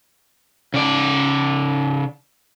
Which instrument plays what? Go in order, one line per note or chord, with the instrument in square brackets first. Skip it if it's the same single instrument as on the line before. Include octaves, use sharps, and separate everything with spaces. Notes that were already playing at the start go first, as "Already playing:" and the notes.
[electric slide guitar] C#3 D5